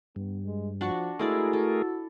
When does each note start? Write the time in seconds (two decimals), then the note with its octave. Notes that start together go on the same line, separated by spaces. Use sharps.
0.16 G2 B3
0.45 G#3
0.81 F3 D4 F#4 C#6
1.19 G#3 A3 E4 F#4 G#4 A#4 D5
1.53 A4